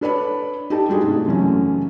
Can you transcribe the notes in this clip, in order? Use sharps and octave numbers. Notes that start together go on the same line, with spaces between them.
D4 A4 B4 C#5 D5 B5
D#4 G4 A4 A5
G3 G#3 D4 D#4 F#4 G#4
G#2 C3 A3
F#2 C#3 E3 F#3 A3 C#4